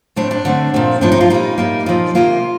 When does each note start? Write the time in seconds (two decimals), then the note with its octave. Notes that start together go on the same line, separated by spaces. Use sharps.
0.16 A2 A3 C4 D4
0.31 D4
0.45 D3 A3 C4
0.74 A#2 F3 A3 C4
1.01 A2 F3 A3 C4 D4
1.12 D#4
1.21 F4
1.30 A#2 G3 A#3 D#4
1.58 A2 G3 A#3
1.86 A#2 F3 A#3
2.15 C3 D#3 A#3 F4